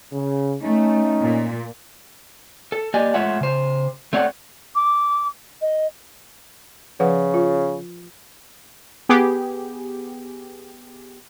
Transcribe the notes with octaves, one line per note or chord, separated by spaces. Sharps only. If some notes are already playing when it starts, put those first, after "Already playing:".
C#3
A3 C#4 D#4
A#2
A4
A#3 G4 D5 D#5 G#5
G#3 A3 F4 C#5 E5 F#5
C#3 C5
A3 C4 C#5 D5 F5 F#5
D6
D#5
C#3 F3 B4 F#5
F4
B3 G4 G#4